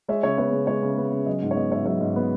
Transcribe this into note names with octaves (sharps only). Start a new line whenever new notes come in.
G#3 C#5 E5
C#3 C#5 E5
B3 C#5
C#3
G#3 C#5
C#3
B3
C#3
F#3 D#5
G#2
C#5
B3 D#5
G#2 C#5 E5
F#3 C#5 E5
G#2
B3